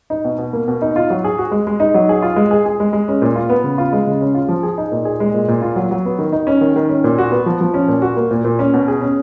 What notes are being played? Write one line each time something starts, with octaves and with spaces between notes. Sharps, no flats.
D#4
B2
B2
A#3
B2
D#4
F4
F#3
G#4
F#4
G#3
G#3
D#4
F#3
G#4
F4
G#3
G#4
G#4
G#3
G#3
C#4
A#2
F4
B3
C#3
F4
G#3
C#3
C#4
F4
F3
G#4
D#4
A#2
G#4
G#3
A#2
A#2
F4
F#3
F#3
B3
D#3
D#4
C#4
D#3
D#3
C#4
A#2
F#4
B3
F3
F3
C#4
A#2
F#4
A#3
A#2
A#2
C#4
B2
G#4
C#4